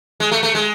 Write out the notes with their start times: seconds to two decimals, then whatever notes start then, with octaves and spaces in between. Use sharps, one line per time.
0.20 G#3
0.32 A3
0.43 A3
0.55 G#3